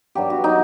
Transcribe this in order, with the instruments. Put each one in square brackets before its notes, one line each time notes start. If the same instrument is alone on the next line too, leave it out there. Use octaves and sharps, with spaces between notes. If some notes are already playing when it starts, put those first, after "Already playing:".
[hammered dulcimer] G2 F#3 G4
F#4
F#3 D#4